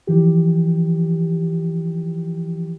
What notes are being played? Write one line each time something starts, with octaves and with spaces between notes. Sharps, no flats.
E3 F3 G4